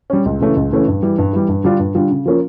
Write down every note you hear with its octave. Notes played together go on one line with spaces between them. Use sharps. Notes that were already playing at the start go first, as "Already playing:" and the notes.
G3 C#4
C#2
C#3 E3 A3 C#4
C#2
C#3 E3 A3 C#4
G2
E3 G3
G2
E3 G3
G2
D3 G3 D4 F4
G2
D3 G3 D4 F4
C#3
F3 A#3 C#4 F4